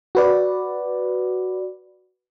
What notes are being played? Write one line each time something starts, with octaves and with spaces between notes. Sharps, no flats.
F#4 B4 D5